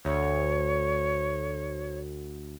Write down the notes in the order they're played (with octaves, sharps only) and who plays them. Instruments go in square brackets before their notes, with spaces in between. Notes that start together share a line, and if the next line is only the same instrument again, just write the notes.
[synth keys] D2 [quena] C#5